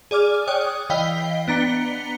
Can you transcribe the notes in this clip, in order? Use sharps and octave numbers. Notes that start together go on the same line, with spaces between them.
G#4 D5 D6 F6
C#5 D5 G5 D#6 F#6
E3 D#5 F5 G5 B6 G7
B3 D4 A#5 B6 C#7 G7